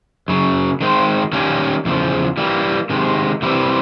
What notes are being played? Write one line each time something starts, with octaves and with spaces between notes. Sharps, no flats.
F#2 C#3 F#3
D#3 G#3 C4
D#3 G3 A#3 C#4
E2 C#3 F3
E3 G3 A#3
C3 D#3 G#3
C3 E3 G3 C4 E4